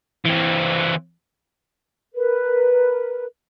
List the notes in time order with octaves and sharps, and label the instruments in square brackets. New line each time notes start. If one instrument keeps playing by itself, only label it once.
[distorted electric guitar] E3 C4
[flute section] A#4 B4